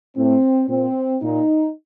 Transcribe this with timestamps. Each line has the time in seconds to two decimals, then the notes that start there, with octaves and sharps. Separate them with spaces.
0.16 A2 C4
0.69 A#2 C4
1.22 A#2 D#4